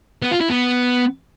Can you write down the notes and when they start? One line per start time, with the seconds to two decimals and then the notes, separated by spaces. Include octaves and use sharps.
0.22 B3
0.32 F4
0.41 E4
0.50 B3